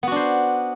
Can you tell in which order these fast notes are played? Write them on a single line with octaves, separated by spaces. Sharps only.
B3 F#4 D4 C5